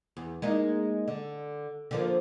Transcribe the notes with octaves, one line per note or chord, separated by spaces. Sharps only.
E2
G#3 A#3 D#4
D3
D3 F3 A#3